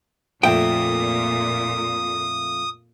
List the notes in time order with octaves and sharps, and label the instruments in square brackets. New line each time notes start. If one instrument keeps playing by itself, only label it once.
[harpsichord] F2 A3 [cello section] A#2 [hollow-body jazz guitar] G5 [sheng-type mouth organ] D#6